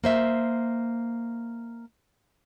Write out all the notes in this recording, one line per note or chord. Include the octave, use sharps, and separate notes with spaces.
A#3 C5 E5